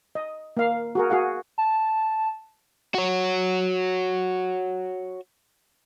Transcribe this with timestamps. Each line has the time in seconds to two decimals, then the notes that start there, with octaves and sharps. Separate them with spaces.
0.15 D#5
0.57 A#3 F5
0.95 F#4 G#4 A#4
1.10 F#4 G#4 F5 F#5
1.58 A5
2.95 F#4 C#5